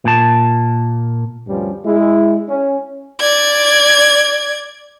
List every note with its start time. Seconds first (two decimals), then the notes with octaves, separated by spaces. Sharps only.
0.05 A#2 A5
1.48 D2 G2 F3 G3 C#4
1.85 G#3 E4
2.48 C#4
3.21 D5 G#6